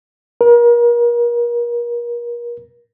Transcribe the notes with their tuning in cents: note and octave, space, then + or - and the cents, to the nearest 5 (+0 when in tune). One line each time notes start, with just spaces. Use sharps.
A#4 +35